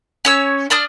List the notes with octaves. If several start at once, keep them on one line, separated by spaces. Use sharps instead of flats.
C#4 C#5 E6
D4 D5 D#6 F6